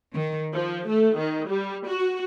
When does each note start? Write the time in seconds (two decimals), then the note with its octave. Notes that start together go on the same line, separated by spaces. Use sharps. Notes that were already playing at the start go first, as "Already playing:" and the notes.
0.14 D#3
0.52 F3
0.88 A3
1.18 D#3
1.48 G3
1.85 F#4